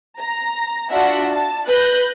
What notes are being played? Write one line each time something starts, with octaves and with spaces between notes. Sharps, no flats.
A#5
D4 F4 F#4 E5 F#5
A5
B4 F#6 G6 A#6